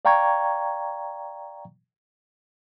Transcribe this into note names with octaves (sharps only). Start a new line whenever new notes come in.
D5 F5 G5 A#5 C#6 G#6